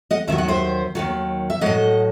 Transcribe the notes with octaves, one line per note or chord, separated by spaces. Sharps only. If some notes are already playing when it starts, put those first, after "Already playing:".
D#5 F#5
D#2 D#3 F#3 E5
F#5
C5 E5
D#2 D#3 F#3
E5
A2 F#3 D#5 F#5